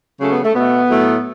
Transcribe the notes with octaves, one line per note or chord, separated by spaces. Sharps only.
C#3 F#3 A3 C#4
B3
A3
B2 A3 B3
A2 F#3 A3